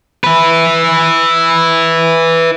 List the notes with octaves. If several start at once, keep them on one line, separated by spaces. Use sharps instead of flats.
E4 B4